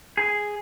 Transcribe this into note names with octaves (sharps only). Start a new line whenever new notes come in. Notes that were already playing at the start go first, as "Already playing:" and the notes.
G#4